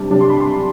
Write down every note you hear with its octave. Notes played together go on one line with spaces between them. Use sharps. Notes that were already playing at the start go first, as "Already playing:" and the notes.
Already playing: C3 G3 D4
C3 G3 D4
C6
B5
C6